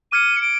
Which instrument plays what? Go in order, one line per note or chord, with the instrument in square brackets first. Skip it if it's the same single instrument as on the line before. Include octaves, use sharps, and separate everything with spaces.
[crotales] D6 F6 G#6 C#7 [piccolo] D#7
[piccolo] C#7
D7